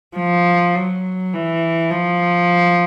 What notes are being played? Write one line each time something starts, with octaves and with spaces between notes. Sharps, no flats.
F3
F#3
E3
F3